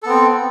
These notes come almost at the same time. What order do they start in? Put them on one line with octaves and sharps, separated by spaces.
A4 B3 C4